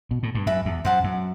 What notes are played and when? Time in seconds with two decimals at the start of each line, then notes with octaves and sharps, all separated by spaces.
0.11 B2
0.23 A2
0.35 G2
0.46 F#2 B4 E5 B5
0.65 E2
0.85 F#2 C5 F#5 A5
1.04 F#2